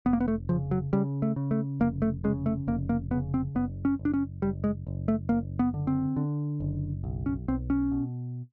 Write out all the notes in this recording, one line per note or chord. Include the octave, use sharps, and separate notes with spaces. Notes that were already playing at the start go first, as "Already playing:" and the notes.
F1 B3
A#3
B3
A3
C#3 F3
F#3
C#3 G3
A3
C#3
A3
F1 A#3
A3
C#3 G#3
A3
F1 A#3
A#3
C#3 B3
C4
F#1 B3
C#4
F#1
D4
C#4
F#1 G3
G#3
F#1
A3
F#1 A#3
B3
D3
C4
D3
F#1
B1
C#4
B1 C4
C#4
B2